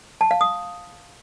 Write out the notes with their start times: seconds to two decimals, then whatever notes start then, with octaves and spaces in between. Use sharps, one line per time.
0.21 A5
0.31 F5
0.41 D#6